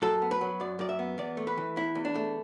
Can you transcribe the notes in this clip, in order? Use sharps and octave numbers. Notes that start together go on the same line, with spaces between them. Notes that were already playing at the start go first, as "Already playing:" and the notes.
F#2 A4
B3
B4
F#3
F#2 D5
F#2 D5
E5
B3
E2 D5
A3
B4
E3
E2 E4
E2
D4
A3